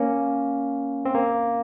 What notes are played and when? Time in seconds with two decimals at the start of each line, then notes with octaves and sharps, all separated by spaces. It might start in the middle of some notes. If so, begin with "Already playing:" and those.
Already playing: A#3 C#4
1.05 C4
1.15 A#3